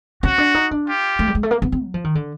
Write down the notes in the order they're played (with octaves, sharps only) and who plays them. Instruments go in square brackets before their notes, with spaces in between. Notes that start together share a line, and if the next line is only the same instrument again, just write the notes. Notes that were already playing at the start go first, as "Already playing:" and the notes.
[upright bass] C#4 [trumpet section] F#4
[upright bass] D4
D#4
D4
[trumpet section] F4 G4
[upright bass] A3
G3
G#3
A3
A#3
B3
C4
F#3
F3
D#3
D3